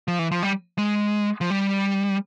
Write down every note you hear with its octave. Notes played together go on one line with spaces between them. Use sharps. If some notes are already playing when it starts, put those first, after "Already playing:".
F3
E3
F3
G3
G#3
F3
G3